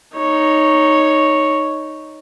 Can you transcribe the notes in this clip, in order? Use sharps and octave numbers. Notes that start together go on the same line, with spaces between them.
D#4 C#5